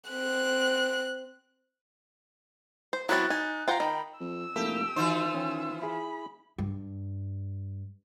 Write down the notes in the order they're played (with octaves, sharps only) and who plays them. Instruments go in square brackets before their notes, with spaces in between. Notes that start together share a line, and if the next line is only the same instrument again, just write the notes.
[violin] C4 F#6
[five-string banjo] C5
[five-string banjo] F#3 B3 C4 [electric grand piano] E4 F#4 A6 [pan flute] F#6
[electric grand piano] D#4 A6 [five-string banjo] G#5
[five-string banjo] F4 C5 F#5 [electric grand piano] G5 A#5
[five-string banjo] D#3 [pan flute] B5
[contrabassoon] F2 [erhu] E6
[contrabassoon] F1 [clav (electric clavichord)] A#3 E4 A4 [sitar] G4
[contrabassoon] D#3 [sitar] E3 F4 C5 [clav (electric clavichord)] D#4 F#4
[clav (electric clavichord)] C#4 G5
[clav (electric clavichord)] E4 G#4 [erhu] B5
[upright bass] G2